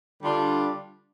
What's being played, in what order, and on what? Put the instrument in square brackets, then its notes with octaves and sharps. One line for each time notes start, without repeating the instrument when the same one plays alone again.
[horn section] D3 G3 D4 F4